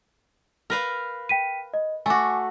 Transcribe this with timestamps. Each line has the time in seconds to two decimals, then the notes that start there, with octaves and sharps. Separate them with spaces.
0.70 A#4 B4 F5
1.29 G5 B6 D#7
1.74 D#5
2.06 A3 F#4 G#5 D6